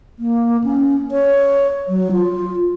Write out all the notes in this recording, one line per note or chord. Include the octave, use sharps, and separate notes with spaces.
A#3
C#4
C#5
F#3
F4